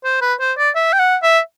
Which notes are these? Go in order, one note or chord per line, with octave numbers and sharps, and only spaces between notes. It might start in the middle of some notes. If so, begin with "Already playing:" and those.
C5
B4
C5
D5
E5
G5
F#5
E5